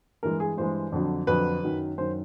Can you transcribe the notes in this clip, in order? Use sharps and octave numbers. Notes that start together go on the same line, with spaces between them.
G2 E3 G#3 A#4
G#4
G2 E3 G#3 C5
F2 D3 F#3
F2 D3 F#3 B4
F#2 D#3 F#3
F#2 D#3 F#3 C5